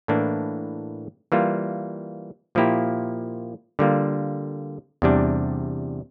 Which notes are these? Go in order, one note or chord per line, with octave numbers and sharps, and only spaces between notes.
A2 E3 A#3 D4
E3 G3 A#3 F4
A#2 F3 A#3 E4 G4
D3 G3 A#3 F4
E2 C3 G3 D4